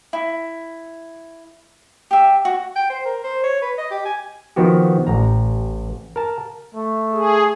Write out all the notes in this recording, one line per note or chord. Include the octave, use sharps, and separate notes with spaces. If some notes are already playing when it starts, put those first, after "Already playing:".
E4
G4 E5
F#4
G5
C5
A#4
C5
C#5
B4
D#5
G4
G#5
D#3 F3 B3 F#4 G4
A1 A#5
A#4 A5
A3
G#4